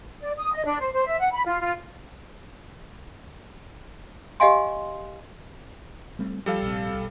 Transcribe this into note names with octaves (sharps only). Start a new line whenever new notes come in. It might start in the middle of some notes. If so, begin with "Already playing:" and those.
D5
D#6
D#5
D4
C5
C5
E5
F#5
B5
F4
F4
G4 D#5 F5 G#5 C6
G3 A3 C4
F3 G3 A4 F5
A#1 C3
B1